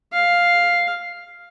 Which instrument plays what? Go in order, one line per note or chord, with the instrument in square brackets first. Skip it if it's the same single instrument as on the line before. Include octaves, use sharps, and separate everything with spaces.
[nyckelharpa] F5